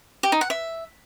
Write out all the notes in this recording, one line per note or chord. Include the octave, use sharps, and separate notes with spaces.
G4
D#4
F#5
E5